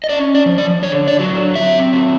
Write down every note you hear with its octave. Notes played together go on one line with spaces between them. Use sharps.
D#5
C#4 D5
D5
F3
D5
D3 C#5
D5
F#3
C4 E5
F#3